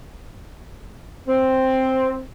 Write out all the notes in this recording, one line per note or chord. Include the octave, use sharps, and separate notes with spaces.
C4